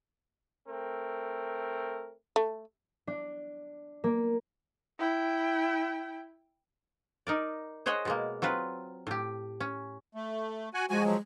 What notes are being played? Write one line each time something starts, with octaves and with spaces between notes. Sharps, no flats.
A3 C4 A#4
A3
D4
A#3
E4 G5
D#4 A#4 D5
G#4 C5 C#5 D#5 F#5
B2 G#3 A#3
F#3 C4 F4 B4
A2 G4
C#4
A3
F#4 F#5 G#5
F3 G#3 F#4 G#5
F3 F#3